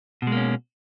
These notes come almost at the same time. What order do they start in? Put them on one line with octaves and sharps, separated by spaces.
B2 G#3 A#3 C#4